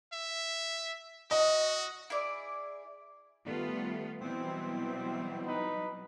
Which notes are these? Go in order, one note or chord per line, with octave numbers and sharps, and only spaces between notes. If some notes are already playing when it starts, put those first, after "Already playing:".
E5
F#4 D#5
E4 G#4 D5
D#3 G3 A3 B3 F4
B2 E3 F#3 G3 B3 C4 E4
D#4 B4